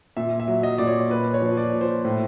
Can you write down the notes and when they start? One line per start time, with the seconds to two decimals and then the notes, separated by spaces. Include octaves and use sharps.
0.17 A#2 E5
0.40 E5
0.48 F#3
0.63 D#5
0.78 A#2 D5
0.87 C#5
1.10 A#2 B4
1.34 C#5
1.42 F3
1.57 D5
1.73 A#2
1.81 C5
2.05 A2